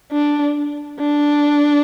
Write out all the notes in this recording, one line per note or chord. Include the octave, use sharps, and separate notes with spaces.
D4
D4